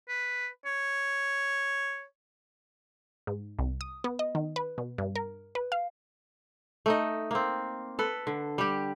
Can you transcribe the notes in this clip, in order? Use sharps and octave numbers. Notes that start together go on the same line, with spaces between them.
B4
C#5
G#2
C2
D#6
B3
D#5
D#3
B4
B2
G2
A#4
B4
F5
A3 D#4 D#5
A#3 C4
A4 B4
D3
G3 G4